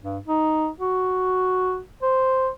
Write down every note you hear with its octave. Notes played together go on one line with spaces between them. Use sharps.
G2
D#4
F#4
C5